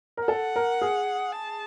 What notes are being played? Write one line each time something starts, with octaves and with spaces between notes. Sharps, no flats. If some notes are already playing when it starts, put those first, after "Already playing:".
A#4
A4 F#5
A#4
G#4
A5